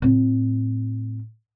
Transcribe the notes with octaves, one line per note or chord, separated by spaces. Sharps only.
A2 C4